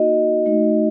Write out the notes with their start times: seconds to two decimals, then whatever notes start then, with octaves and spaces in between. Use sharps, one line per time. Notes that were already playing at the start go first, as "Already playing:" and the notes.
Already playing: A#3 D#4 F#4 D#5
0.46 A3 D#4 F#4